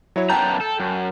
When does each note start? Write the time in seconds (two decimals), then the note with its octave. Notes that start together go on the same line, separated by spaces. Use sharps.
0.16 F#3 E4 C#5
0.30 F#2 B3 G5 A5 A#5 G6
0.61 A4
0.80 F#2